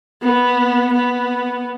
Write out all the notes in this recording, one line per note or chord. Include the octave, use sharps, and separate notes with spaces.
B3
B3